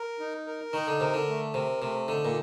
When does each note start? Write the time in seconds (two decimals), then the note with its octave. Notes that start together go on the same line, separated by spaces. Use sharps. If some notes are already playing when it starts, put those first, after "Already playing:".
Already playing: A#4
0.20 D#4
0.46 A#4
0.73 D#3 D#4
0.88 D3
1.00 C3 A#4
1.14 D3
1.28 A3
1.54 C3 A#4
1.82 C3 A3
2.08 D3 D#4
2.25 A#2